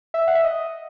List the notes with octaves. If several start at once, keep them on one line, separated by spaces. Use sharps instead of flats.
E5
F#5
E5
D#5